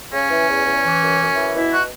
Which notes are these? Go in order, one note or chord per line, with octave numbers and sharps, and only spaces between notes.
C#3 C#4
E3
E2
E2
E3
F#2
F#2
E3
B2 E4
B2 F#4